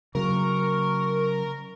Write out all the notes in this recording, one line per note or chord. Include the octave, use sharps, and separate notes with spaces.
C#3 F#3 A#4 C#6